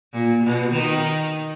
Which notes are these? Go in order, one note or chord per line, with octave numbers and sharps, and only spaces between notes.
A#2
B2
D#3